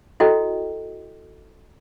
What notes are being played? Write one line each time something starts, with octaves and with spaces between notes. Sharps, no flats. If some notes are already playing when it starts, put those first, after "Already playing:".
E4 F#4 A4 D#5 G5